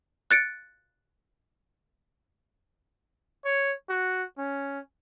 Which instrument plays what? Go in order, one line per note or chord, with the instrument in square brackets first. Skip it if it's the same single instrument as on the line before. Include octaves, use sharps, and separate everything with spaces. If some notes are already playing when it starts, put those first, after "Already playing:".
[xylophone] F#6 A6 C#7 D7
[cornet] C#5
F#4
C#4